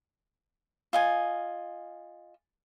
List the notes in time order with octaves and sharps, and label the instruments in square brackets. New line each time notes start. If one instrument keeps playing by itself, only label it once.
[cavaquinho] F4 D#5 G#5